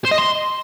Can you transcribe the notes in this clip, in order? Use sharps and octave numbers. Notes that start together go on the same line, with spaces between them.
C5
D#5
C6